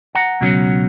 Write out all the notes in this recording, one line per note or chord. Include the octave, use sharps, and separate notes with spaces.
F#5 A#5
C#2 B2 F#3 C#4